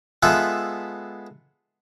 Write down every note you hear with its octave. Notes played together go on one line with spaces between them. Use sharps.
G#3 B3 F4 A4 B4 E5